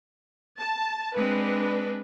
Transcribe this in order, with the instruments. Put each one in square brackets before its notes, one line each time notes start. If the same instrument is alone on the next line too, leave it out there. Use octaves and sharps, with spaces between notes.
[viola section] A5
[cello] G#3 C4 [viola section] D4 B4